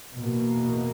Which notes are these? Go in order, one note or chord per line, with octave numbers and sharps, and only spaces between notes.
E2 B2 A#3